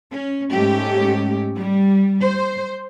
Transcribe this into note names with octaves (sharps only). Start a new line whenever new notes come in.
C#4
G#2 G#3 A3 C#4 G4
G3
C5